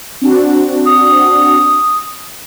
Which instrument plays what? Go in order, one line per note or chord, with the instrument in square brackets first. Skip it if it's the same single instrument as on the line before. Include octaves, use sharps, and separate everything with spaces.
[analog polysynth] C4 D4 F#4
[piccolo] D#6